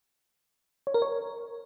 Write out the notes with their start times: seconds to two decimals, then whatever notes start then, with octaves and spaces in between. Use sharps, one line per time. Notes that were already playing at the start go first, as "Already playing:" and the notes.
0.87 C#5
0.94 A#4
1.02 C#5